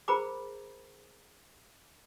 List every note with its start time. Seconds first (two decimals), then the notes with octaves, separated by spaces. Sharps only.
0.08 G#4 A#4 C5 A#5 B5 D6